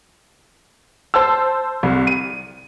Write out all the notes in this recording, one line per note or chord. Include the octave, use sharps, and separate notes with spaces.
C5 A5 E6
C2
D#7